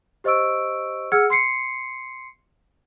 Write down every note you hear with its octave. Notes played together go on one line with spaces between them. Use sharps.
G4 C5 D#5 C#6 E6 D7
G#4 F#5 E6 F6 G#6 C#7
C6 C7 C#7